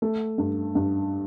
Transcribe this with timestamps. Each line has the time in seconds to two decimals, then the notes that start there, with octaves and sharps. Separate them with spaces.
0.02 A3
0.38 G2
0.75 G2